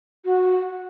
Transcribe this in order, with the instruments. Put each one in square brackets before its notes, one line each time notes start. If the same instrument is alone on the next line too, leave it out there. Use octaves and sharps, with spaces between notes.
[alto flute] F#4